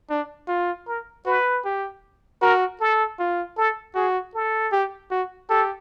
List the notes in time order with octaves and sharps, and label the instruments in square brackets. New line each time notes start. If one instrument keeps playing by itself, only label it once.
[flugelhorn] D4
F4
[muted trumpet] A#4
[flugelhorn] F#4 [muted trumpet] B4
[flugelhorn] G4
[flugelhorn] F#4 [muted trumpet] A#4
[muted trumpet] A4
[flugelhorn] F4
[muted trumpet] A4
[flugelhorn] F#4 [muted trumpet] G#4
[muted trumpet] A4
[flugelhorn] G4
F#4
[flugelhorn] G4 [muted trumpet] A4